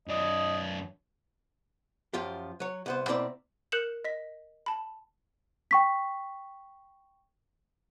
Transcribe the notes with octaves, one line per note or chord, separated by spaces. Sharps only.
F#2 D5 D#5
F#2 F3 F4 G4
F#3 C#5
C2 B3 C5
B2 A#3 C4 E4 D5
A#4 F#6 G6 C#7 E7 F#7
D#5 B6
A5 B5
G5 C#6 B6